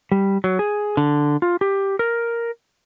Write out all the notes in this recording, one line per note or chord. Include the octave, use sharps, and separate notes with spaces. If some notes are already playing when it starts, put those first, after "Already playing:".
G3
F#3
G#4
D3
F4
G4
A#4